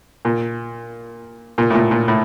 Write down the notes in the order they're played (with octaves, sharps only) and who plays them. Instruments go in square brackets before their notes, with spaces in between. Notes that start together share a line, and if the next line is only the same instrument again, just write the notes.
[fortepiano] A#2
A#2
A2
A#2
A#2
A2